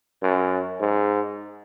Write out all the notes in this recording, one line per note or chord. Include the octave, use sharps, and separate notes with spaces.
F#2
G#2